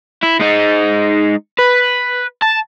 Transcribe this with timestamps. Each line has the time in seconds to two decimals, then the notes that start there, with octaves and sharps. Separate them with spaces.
0.23 E4
0.40 G#3 D#4
1.59 B4
2.42 A5